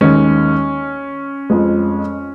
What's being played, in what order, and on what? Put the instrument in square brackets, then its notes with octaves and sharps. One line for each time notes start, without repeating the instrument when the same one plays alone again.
[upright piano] D#2 D#3 G#3 C#4
F2 F3 G#3